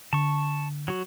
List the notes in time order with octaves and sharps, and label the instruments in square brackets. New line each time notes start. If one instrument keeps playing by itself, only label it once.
[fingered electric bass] D3 [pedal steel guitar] A5 C#6
[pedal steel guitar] F#3 F#4